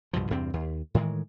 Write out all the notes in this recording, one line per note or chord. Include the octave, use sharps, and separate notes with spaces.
C2 G2 B2 F3
E2 G2 C3 C4
D#2
A2 D#3 E3 G#3